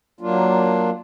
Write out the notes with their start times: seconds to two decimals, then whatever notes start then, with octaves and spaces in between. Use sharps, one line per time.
0.21 F#3 A#3 D4 F4